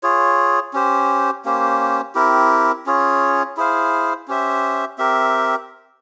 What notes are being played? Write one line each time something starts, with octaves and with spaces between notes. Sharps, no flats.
F4 G#4 C#5
C#4 G4 C5
A#3 C#4 G4 C5
C4 E4 G4 A#4
C#4 F4 G#4 C#5
E4 G#4 C5 F5
C#4 G4 C5 E5
C4 G4 A#4 E5